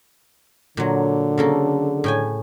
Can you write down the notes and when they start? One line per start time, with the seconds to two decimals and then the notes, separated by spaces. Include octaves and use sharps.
0.77 A#2 D3 F#3
1.38 C#3 A#3 A4
2.04 A2 G5 G#5